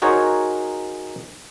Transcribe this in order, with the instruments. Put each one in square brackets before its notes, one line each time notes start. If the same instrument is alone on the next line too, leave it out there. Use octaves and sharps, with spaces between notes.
[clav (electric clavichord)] D#4 F#4 G#4 A#4 C5 C#5